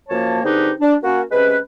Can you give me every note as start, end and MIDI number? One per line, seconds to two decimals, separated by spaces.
0.09 0.39 42
0.09 0.39 53
0.09 0.39 58
0.09 0.39 73
0.09 0.39 81
0.43 0.70 50
0.43 0.70 60
0.43 0.70 63
0.43 0.70 67
0.43 0.70 68
0.43 0.70 71
0.80 0.94 62
1.02 1.22 58
1.02 1.22 61
1.02 1.22 66
1.32 1.57 48
1.32 1.57 56
1.32 1.57 61
1.32 1.57 71